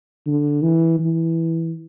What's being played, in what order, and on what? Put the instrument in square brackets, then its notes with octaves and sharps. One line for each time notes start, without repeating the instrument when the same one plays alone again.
[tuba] D3
E3
E3